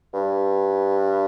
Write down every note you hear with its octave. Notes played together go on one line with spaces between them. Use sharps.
G2